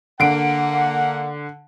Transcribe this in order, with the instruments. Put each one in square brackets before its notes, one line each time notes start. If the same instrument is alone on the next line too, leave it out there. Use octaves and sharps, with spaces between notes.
[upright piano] D3 D7 [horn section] A#3 F#5